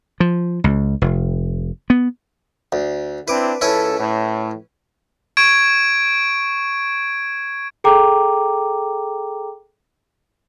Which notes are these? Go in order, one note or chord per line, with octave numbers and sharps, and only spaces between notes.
F3
C#2
F1
B3
D2
C4 D4 E4 B4 D6
C#2 C#4 E4 A4 B4
A2
C#6 G#6 D7
G#4 A4 G5 A#5 D6